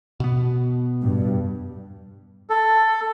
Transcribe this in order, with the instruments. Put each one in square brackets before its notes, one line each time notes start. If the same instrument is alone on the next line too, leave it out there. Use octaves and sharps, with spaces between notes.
[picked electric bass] B2 B3
[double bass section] G2
[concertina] A4